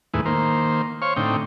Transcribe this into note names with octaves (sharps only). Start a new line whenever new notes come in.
D#2 A2 G#3 E4 B4
D#3 A#3 C5
C5 C#5 F5 C#6
A2 D3 C4 D#4 G5